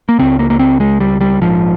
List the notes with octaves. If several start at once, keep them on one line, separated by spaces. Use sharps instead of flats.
A#3
C#2 C#3 C4
A#3
A#3
C4
G#3
G3
G3
A#1 G#2 F3